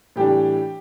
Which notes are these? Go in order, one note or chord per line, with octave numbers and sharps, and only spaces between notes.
A2 E3 G3 D4 G4